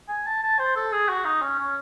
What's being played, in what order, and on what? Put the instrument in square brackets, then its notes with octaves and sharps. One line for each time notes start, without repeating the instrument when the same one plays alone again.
[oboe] G#5
A5
A5
C5
A4
G#4
F#4
D#4
C#4
C#4